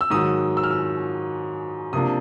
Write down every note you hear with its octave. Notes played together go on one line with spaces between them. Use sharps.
E6
G#2 D#3 F#3 D#6
E6
F6
E6
C3 F3 A#3 D4 D#6